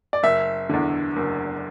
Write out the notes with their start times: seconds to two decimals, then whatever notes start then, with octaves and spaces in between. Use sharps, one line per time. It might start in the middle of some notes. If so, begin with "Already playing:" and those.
0.13 D5
0.23 F#1 E5
0.69 E2 D3
1.16 F#1